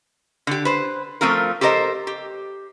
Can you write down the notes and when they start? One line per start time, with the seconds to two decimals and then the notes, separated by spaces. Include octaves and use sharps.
0.47 D3 G4
0.65 B4 C5
1.21 F3 A3 C4 F4 A#4
1.61 G4 A4 A#4 C5 D#5
2.07 G4